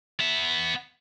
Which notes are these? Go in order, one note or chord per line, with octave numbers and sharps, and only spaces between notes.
B3 E5